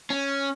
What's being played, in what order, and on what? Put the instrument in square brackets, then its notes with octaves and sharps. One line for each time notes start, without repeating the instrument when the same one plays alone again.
[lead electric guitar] C#4